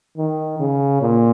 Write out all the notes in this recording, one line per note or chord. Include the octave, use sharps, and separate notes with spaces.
D#3
C#3
A#2